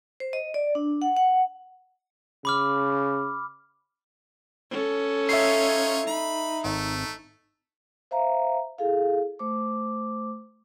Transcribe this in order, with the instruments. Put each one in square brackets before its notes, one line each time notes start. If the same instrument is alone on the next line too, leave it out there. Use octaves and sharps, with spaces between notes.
[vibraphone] C5
D#5
D5
D4
F#5
F#5
[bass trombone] C#3 [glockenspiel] B5 D6 F6
[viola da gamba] C#4 A4
[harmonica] D#4 F4 C#5 [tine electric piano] E5 C7
[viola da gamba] D#4 [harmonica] B5
[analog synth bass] G#1 [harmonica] A3
[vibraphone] C5 E5 F5 A#5
E4 G#4 A4 F5
A3 C5 D6